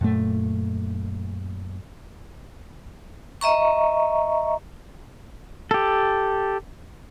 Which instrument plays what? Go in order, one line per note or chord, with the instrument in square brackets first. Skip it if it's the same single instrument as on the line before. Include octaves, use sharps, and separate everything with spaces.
[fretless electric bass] F#2 A#2 A3
[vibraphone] D#5 E5 A#5 C#6
[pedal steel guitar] G4 A4